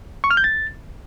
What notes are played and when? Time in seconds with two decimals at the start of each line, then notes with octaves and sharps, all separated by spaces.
0.24 C#6
0.31 F6
0.37 G6
0.44 A6